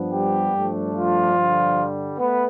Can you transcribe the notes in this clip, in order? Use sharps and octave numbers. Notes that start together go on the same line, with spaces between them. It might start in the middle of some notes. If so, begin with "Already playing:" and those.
Already playing: G2 F3 B3 D4
G3 G4
G2 F3 A3 D4
F3 F4
G2 D3 G3
A3 B3 B4